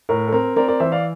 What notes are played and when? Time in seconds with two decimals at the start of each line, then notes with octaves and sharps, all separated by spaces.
0.09 A2 A#4
0.28 A4
0.32 C4 A#4
0.56 C4 A#4 D5
0.68 A#4 D5
0.80 E3 C5 E5
0.92 D5 F5